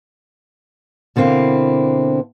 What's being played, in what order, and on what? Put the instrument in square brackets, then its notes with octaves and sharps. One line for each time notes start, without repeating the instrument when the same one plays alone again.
[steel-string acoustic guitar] B2 D3 A#3 C4 E4